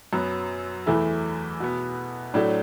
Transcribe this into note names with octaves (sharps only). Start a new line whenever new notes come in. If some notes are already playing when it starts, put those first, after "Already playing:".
F#2 F#3 B3
E2 E3 A3 E4
B2 B3
A2 F#3 A3 D4